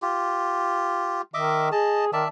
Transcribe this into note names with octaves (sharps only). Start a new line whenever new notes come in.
F4 G4
D#3 D#5 E5 D6
G#4 D#5 A5
D#3 D5 E5 A5